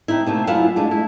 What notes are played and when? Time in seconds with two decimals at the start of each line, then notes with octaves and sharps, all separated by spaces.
0.08 C4 D#4 E4
0.26 C3 A3 A#3
0.47 F#2 E4 F4 F5 F#5
0.76 G#3 A3 D4
0.91 E4